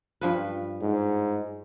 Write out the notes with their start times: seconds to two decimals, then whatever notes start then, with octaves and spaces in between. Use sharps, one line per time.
0.21 G2 F3 B4
0.81 G#2